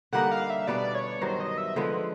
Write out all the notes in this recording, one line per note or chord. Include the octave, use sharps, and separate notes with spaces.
D3 G3 A#3 D#4 F#5
F5
E5
B2 G3 B3 D4 D5
C#5
G2 D#3 F#3 C5
D#5
E5
D3 F3 G#3 B3